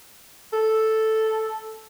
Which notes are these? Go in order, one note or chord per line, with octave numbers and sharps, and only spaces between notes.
A4